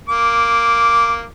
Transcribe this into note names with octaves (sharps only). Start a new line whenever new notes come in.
A#3 D6